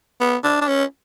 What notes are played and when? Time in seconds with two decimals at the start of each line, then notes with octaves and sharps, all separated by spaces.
0.21 B3
0.44 D4
0.61 D4
0.68 C#4